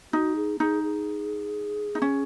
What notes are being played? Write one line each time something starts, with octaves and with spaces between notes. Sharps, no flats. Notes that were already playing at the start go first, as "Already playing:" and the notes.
D#4 F#4
G#4
D#4 G#4
G#4
D#4
C#4